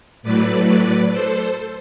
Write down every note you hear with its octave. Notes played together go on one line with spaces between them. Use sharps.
A2 F#3 A3 B4 D5
B4 D5
A4 C5